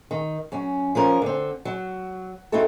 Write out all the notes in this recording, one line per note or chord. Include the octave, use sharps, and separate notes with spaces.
D#3
F#2 C#4
F3 C#4 A#4
D3 C4
F#3
C4 D#4 E4 F#4 A4